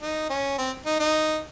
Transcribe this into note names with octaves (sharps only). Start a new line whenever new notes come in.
D#4
C#4
C4
D#4
D#4